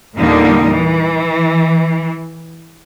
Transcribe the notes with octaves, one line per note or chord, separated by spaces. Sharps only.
E2 A#2 D3 G3 A#3 D#4
E3